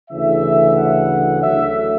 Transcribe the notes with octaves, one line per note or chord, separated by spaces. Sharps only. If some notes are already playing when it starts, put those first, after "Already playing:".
D2 C#3 E3 E5
F#5
D2 D3 F#3 E5